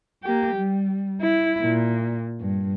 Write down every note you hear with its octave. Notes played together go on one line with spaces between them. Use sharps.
A#3 G4
G3
E4
A#2
G2